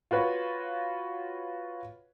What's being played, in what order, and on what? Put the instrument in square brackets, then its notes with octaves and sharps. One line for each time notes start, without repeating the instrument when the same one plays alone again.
[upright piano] F4 F#4 B4 C#5